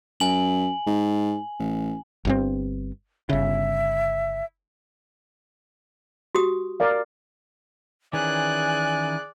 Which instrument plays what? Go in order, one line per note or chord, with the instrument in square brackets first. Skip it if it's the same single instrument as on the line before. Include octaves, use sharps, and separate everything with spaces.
[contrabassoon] F#2 [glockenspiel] G#5 F#7
[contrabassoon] G#2
A1
[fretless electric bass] G1 G2 C4
[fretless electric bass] G1 C#3 [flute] E5
[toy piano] F#4 G4 D#6
[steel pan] A#4 D5 F5
[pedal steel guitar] D#3 E3 C#4 [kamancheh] G#4 F#6 [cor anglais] D5 [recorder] G#5